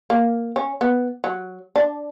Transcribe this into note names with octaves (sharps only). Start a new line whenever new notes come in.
A#3
C#4
B3
F#3
D4